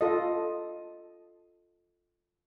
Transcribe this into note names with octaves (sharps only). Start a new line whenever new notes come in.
F4 A4 D#5